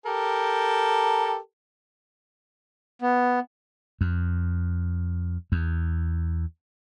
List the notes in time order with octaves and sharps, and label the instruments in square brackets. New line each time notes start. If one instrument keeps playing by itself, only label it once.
[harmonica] G4 A4 A#4
[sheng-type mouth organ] B3
[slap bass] F2
E2